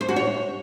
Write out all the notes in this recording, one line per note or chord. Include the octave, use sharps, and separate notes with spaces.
C5
F#4
C#5